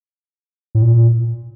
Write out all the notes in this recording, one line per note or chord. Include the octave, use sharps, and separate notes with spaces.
A2
A#2